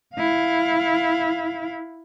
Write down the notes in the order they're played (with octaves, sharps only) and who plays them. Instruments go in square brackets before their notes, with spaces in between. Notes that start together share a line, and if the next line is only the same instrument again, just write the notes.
[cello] E4 F5